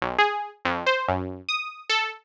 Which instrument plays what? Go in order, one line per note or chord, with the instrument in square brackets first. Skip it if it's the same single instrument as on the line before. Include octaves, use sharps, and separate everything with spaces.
[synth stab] B1
G#4
F2
C5
F#2
D#6
A4